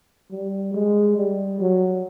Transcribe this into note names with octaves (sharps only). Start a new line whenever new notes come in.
G3
G#3
G3
F#3